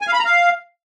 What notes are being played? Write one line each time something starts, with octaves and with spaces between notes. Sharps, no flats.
G#5
F5
B5
A#5
F5